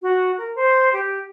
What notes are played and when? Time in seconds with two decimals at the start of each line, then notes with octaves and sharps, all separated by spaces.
0.02 F#4
0.37 A#4
0.55 C5
0.93 G4